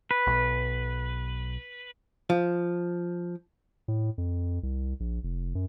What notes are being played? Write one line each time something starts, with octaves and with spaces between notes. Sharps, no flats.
B4
B1
F3
A2
F2
C2
A#1
F1
F#2